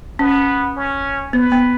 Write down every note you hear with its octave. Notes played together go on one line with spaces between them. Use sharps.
B3 C#4
C#4
B3 B4
B3